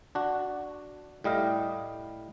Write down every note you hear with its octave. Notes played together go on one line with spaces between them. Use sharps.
D4 F#4
A2 G3 D#5 F5